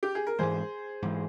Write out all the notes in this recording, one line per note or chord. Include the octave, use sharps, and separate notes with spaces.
G4
G#4
A#4
G#2 E3 G#3 G#4 C5
G#2 E3 G#3